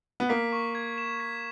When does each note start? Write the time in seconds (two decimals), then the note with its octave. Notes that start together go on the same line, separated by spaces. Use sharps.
0.20 B3
0.29 A#3 B6
0.53 C#6
0.75 G#6
0.98 E7
1.20 B6